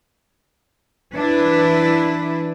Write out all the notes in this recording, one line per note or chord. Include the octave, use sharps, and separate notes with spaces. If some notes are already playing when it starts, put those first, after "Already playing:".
E3 D4 E4 B4